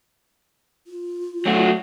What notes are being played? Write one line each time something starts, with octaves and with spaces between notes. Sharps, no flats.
F4
F#3 A3 F#4